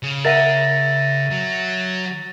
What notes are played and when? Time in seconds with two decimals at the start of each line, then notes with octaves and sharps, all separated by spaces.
0.03 C#3
0.25 A#4 E5 F#5 A6 A#6 D#7
1.31 F#3